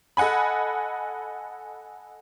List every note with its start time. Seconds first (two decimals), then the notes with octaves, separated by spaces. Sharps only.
0.17 A4 D#5 F#5 G#5 B5